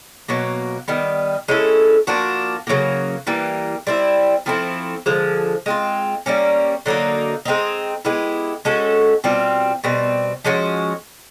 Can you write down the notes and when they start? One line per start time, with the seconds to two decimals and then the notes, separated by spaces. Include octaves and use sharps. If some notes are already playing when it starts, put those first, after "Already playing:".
0.28 B2 F#3 A#3
0.88 D#3 G3 B3
1.48 G#3 C#4 E4 A4
2.07 F3 A#3 D4 F#4
2.67 C#3 F#3 A#3
3.27 E3 G3 A#3
3.87 G3 C4 E4
4.46 F3 A3 C4 E4
5.06 D3 F3 G#3
5.66 G#3 C4 F4
6.26 G3 A#3 C#4
6.86 D3 F#3 A#3 D#4
7.45 G#3 C4 D#4
8.05 G#3 B3 E4 G4
8.65 G#3 C#4 F#4 A4
9.24 B2 G3 C4 F4
9.84 B2 G3 C4
10.44 F3 G#3 C#4 F#4